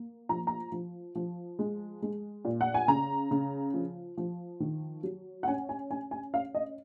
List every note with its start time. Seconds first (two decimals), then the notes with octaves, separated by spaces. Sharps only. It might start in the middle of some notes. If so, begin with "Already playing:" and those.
Already playing: A#3
0.29 F3 A#5
0.47 A#5
0.72 F3
1.15 F3
1.59 G#3
2.02 G#3
2.45 A#2
2.61 F#5
2.74 G#5
2.88 C#3 A#5
3.31 C#3
3.74 F3
4.17 F3
4.60 D#3
5.03 F#3
5.43 F#5
5.47 C#4 G#5
5.69 G#5
5.90 C#4 G#5
6.11 G#5
6.33 C#4 F5
6.55 D#5